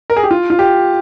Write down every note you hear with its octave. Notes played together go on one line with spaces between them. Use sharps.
A#4
G#4
G4
F4
F4
G4